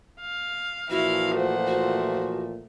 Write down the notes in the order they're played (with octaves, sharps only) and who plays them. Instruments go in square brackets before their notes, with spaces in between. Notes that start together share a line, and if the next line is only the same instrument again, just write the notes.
[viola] F5
[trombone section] A#2 E3 F3 [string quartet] E4 [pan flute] F#4 [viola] F5
[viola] A3 [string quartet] C5 F#5
[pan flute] F#4